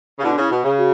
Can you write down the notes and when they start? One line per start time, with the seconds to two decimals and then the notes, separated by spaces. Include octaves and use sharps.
0.19 C#3
0.23 B2 D3 E4
0.32 D4
0.37 C#3 E4
0.51 B2
0.64 C#3
0.78 F#4